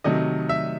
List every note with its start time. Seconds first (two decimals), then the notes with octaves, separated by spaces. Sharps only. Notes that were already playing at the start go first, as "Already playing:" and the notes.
0.04 C3 D#3 F#3 A3 D#5
0.49 E5